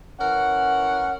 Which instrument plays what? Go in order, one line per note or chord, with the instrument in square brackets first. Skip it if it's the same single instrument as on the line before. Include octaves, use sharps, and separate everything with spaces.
[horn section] E3 C#4 A#4 F#5